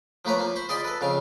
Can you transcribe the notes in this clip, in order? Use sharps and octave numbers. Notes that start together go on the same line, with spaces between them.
F3 A3 A#3 B4 C#5
F3 A#3
C5 B5 C#6
F4 G#4 D5 D#5 B5 C6
A4 B4
F2 C#3 F5